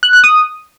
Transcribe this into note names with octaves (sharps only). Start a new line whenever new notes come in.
F#6
F#6
D#6